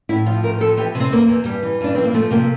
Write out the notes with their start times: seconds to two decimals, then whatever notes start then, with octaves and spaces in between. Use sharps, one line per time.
0.09 A2 E4
0.26 F3 F4
0.43 A2 A#4
0.60 F3 A4
0.77 E3 G4
0.95 C3
1.00 C4
1.12 E2 A#3
1.29 E2
1.45 G2 G3
1.63 E3
1.81 G2 D4
1.95 E3 C4
2.04 A#3
2.14 F3 A3
2.31 C3 A#3